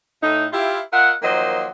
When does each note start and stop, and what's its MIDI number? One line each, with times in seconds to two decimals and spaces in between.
0.22 0.45 45
0.22 0.45 63
0.53 0.80 64
0.53 0.80 65
0.53 0.80 67
0.93 1.12 65
0.93 1.12 70
0.93 1.12 75
0.93 1.12 76
0.93 1.12 78
1.23 1.67 51
1.23 1.67 53
1.23 1.67 54
1.23 1.67 58
1.23 1.67 72
1.23 1.67 75